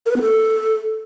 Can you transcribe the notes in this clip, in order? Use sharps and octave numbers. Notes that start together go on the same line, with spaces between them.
A#4
B4
B3
A4